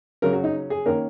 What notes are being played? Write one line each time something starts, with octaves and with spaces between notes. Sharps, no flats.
C#3 F#3 C#4 A#4
F#4
D#4
G#4
D#3 A#3 C#4 A#4